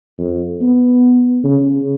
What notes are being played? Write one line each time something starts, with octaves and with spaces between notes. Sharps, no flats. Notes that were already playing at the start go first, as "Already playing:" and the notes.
F2
B3
C#3